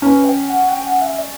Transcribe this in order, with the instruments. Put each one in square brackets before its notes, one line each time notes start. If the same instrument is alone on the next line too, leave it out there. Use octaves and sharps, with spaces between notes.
[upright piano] C#4 [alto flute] B4
[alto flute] G5
F#5
G5
F#5
E5
D5